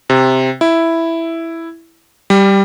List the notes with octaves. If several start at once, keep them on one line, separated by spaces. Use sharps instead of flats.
C3
E4
G3